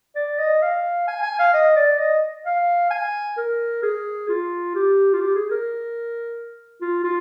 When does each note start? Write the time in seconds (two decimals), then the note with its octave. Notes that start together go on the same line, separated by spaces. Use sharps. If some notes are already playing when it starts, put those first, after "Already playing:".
0.16 D5
0.39 D#5
0.62 F5
1.08 G#5
1.23 G#5
1.39 F5
1.54 D#5
1.76 D5
1.99 D#5
2.46 F5
2.91 G#5
3.38 A#4
3.83 G#4
4.29 F4
4.75 G4
5.13 F4
5.20 G4
5.36 G#4
5.51 A#4
6.81 F4
7.04 F4